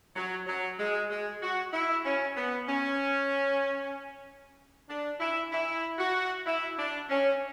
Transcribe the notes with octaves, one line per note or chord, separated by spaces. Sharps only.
F#3
F#3
G#3
G#3
F#4
E4
C#4
B3
C#4
D4
E4
E4
F#4
E4
D4
C#4